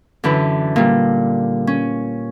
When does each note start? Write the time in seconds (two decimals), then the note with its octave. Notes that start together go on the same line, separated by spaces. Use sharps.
0.24 F#2 D3 E3 B4
0.76 A#2 G3
1.67 C#4